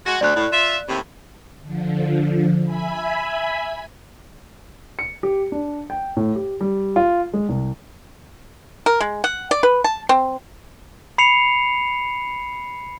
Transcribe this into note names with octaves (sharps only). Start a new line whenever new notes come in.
G#3 F#4
D2 D5 F#6
A2
F4 E5
D#2 A2 C3
D3 F3
E5 G#5 B5
C#7
G4
D4
G5
A2
G4
G3
F4
G#3
C2
A#4
G#3
F#5
D5
B4
A5
C4
B5 C7 C#7 F7